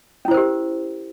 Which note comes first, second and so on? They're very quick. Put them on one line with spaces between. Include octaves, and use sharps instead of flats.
C#4 E4 C5 A#4 G4